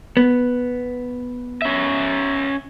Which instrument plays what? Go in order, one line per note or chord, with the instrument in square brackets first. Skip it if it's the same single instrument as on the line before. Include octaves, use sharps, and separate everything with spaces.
[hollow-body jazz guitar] B3
[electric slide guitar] C#4 E5